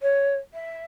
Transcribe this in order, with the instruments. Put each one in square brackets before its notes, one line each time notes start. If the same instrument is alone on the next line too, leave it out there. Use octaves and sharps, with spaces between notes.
[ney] C#5
E5